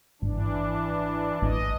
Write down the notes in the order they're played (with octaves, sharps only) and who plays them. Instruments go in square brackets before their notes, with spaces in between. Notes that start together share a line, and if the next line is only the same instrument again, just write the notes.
[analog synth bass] G#1 [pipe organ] E3 D4
[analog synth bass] A1 [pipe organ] D#5